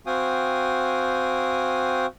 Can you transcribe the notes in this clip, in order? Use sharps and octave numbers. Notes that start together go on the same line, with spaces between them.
C4 F#4 F5 G5 G#5 D#6